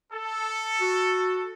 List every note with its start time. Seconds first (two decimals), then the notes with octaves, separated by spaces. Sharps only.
0.12 A4
0.81 F#4